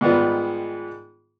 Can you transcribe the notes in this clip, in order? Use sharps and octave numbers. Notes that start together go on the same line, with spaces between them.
G#2 D#3 G3 B3 F4